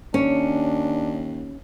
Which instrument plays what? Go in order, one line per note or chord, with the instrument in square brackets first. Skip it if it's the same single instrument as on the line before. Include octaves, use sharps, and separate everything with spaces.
[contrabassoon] D#2 [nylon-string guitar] C#4 [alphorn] D4